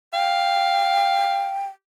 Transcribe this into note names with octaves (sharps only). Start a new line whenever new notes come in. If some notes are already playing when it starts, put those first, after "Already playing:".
F5 G5